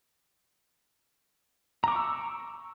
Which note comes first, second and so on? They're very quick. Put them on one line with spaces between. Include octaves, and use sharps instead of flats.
A#5 D6 C#6 E6